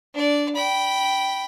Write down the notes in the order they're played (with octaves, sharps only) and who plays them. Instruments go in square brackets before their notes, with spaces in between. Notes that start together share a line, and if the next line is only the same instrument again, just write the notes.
[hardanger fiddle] D4 D5
G5 B5